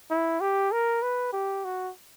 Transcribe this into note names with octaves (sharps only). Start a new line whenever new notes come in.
E4
G4
A#4
B4
G4
F#4